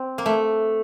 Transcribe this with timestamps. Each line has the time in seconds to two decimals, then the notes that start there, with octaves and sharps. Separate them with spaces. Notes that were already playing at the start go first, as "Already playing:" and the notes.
Already playing: C4
0.18 A#3
0.26 A3